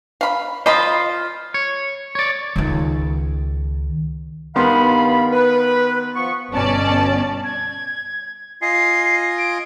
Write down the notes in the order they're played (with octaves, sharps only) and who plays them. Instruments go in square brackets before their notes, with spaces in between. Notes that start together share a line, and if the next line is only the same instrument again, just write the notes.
[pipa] F5 B5
[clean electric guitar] F4 C5 [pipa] D#5 B5
[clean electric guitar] C#5
C#5 D5
[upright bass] C#2 D#3
[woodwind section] G2 F5 B5 [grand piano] D#3 B3 C6
[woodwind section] B4
F3 B3 C#6
[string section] G1 B2 C#4 D5 A5
[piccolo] G#6
[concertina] F4 D#5 G#5 [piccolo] C7
[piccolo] D7